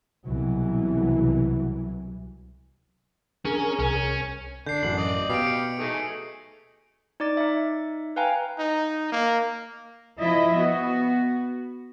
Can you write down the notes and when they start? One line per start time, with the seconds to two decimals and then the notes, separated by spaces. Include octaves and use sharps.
0.25 C2 B2 E3 F#3
3.45 C#4 D4 G#4 A#4
3.79 C2 C#4
4.66 D3 D4 G6 C7
4.83 A1 F#2 F#7
4.97 D5 D#5
5.30 B2 G4 F5 C7 D7
5.47 C#7
5.79 A3 D#4 G#4
7.20 D#4 D5 D6 A6
7.37 D#4 E5
8.16 B4 F5 G5 G#5 A#5
8.59 D#4
9.12 A#3
10.19 F3 E4 D#5 E5
10.56 B3 F#4